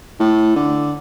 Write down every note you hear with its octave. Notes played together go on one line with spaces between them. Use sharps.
A2
D3